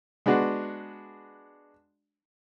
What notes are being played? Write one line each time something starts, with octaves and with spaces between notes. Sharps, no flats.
G#3 B3 D4 F#4